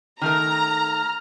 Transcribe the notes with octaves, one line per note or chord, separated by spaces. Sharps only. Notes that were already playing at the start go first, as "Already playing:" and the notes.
D#3 A3 A#4 A#5 F6